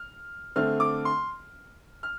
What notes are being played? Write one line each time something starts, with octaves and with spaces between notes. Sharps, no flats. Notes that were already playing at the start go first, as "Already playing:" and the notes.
Already playing: F6
D3 A3 C4 F6
D6
C6
F6